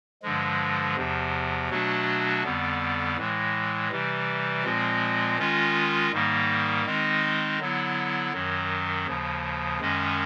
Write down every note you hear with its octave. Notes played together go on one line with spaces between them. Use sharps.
G2 D3 F3 G#3
E2 C3 F3
B2 F#3 A3 D4 F#4
F2 D3 G3 B3
A2 E3 G#3
C3 E3 G3
A#2 F3 G#3 C4
D#3 G#3 C#4 F4
G#2 D#3 G3 A#3
D#3 G#3 C4 D#4
D3 F#3 B3 E4
F#2 D#3 F#3
D#2 C#3 F3
F#2 D#3 G#3 C#4